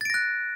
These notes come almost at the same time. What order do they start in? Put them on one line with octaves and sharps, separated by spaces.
A6 D7 A#6 F#6